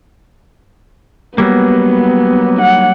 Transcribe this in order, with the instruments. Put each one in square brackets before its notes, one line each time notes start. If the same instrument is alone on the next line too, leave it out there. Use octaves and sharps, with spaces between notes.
[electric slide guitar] F#3 G3 A#3 [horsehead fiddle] B3
[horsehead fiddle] F#5